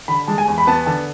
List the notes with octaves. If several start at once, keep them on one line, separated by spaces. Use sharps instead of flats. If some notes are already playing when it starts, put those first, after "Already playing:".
D3 B5
G#3 A5
G#5
E2
B5
B3 A5
D3 A5